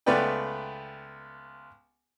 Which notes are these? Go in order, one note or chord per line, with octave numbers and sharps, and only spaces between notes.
C#2 A3 B3 B4 D5 G5